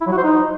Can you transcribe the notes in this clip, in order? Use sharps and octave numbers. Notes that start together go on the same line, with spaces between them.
E4
F#3
F#4
C5
D#4